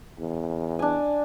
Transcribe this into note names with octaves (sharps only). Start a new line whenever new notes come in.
E2
D4 G#5